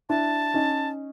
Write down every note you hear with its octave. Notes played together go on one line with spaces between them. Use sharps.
D4 E4 A5
C#4 D#4